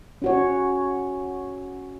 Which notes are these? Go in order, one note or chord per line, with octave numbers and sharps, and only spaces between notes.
C#4 F#4 C#5